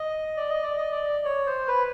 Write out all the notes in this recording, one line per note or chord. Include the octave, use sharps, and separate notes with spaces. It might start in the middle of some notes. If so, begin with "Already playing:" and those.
Already playing: D#5
D5
D#5
D5
D#5
D5
C#5
C5
B4